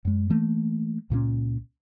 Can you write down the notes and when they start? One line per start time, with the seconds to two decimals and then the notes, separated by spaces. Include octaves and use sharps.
0.05 F#2 G#3
0.30 E3 A3 A#3
1.10 C#2 A#2 F3 C#4